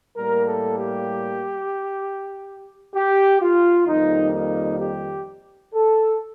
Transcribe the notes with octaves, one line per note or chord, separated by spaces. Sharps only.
A2 G3 A#3 A#4
A4
G4
G4
F4
F2 D#3 G3 A#3 D#4
D#4
G4
A4